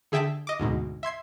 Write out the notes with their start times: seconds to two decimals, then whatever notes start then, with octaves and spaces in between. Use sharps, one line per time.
0.12 D3 G#4 E5 G5 A5 B6
0.47 D#5 D6
0.60 D2 G#2 B2
1.03 E5 C6 G#6 C7